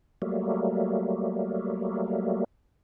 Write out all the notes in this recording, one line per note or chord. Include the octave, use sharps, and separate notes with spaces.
F#3 G3 A3 A#3